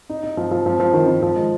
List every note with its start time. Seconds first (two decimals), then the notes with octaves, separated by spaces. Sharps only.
0.10 D#4
0.23 D#4
0.37 F3
0.51 F3
0.66 F3
0.80 F3
0.93 D#3
1.08 D#3
1.22 F3
1.35 G#3